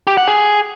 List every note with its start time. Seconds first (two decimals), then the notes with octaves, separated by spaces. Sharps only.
0.07 G4
0.17 F#5
0.28 G#4